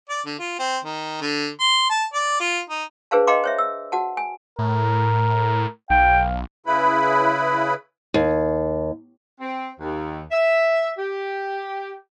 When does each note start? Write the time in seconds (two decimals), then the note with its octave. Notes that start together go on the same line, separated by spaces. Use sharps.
0.09 D5
0.26 D3
0.39 F4
0.59 C4
0.84 D#3
1.21 D3
1.60 C6
1.90 A5
2.13 D5
2.40 F4
2.69 D#4
3.11 D4 G#4 B4 C5 F5 A5
3.27 D#5 F5 G5 A#5 C6 D6
3.44 C5 C#5 E5
3.58 E6
3.92 F#4 F#5 A5
4.17 G#5
4.59 A2 A#4
5.90 B1 F5 G5
6.66 C#3 E4 B4 B5
8.14 D#2
9.40 C4
9.80 D#2
10.31 E5
10.98 G4